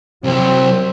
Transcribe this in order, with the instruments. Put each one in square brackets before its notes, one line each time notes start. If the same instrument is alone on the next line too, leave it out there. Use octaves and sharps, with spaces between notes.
[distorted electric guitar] C2 [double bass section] F#3 [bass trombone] C4